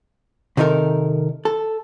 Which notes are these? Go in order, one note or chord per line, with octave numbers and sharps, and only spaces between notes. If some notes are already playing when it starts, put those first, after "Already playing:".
C3 D#3 D#4 A4 A#4
A4